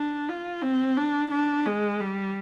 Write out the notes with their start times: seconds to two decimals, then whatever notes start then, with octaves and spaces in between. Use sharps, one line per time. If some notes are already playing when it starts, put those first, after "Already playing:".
Already playing: D4
0.29 F4
0.62 C4
0.97 D4
1.31 D4
1.66 G#3
2.00 G3